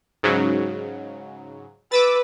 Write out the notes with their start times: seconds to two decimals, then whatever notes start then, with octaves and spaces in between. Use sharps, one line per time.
0.23 G#2 C#3 F#3
1.92 B4 D6 E6 A6